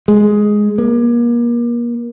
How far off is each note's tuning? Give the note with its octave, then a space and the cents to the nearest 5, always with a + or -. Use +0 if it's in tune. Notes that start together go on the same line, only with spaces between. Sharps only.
G#3 +5
A#3 +35